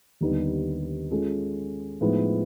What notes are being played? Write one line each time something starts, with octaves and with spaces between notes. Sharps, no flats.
D#2 D3 G3 B3 D#4
G#3 C#4 F4 A4
A2 F3 G#3 B3 D#4